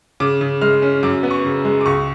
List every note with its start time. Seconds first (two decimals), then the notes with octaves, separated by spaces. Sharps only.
0.20 C#3 D6
0.41 C#3
0.61 G#3 F6
0.82 C#4
1.03 F#2 D6
1.23 B3
1.31 C#6
1.44 C#3
1.65 G#3
1.81 D6
1.86 C#2 C#6